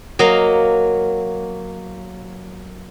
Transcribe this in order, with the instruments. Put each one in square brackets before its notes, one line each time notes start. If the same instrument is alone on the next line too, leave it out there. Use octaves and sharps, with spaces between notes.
[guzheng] F#3 A#3 D#5 F5